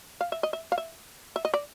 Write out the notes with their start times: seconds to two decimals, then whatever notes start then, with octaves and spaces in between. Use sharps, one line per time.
0.21 F5
0.32 E5
0.43 D#5
0.53 E5
0.72 F5
0.78 E5
1.36 E5
1.45 D#5
1.54 D5